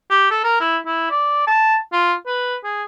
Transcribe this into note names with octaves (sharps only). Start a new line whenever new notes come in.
G4
A4
A#4
E4
E4
D5
A5
F4
B4
G#4